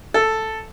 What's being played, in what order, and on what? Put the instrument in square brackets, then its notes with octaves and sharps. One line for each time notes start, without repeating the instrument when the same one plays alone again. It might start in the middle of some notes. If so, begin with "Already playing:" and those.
[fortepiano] A4